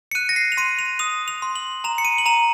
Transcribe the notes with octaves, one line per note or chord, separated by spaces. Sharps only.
C#7
F#6 D#7
A#6
C7
F7
C6 D#7
F7
D#6 F7
F7
C6
F#7
A#5 F7
C#7
D#7
F#7
A#5 F7